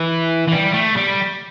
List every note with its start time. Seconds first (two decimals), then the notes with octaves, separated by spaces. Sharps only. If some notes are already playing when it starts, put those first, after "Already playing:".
Already playing: E3
0.48 E3
0.52 G3
0.73 A3
0.96 G3